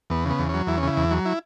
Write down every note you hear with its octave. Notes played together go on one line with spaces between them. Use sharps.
E2 B3
C#3 B3
E2
F#3 C#4
E2 E4
C#4
C#3 E4
E2
F#3
E4